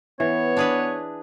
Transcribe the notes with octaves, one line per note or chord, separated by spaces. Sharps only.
E3 B3 C#5
D4 G#4 B4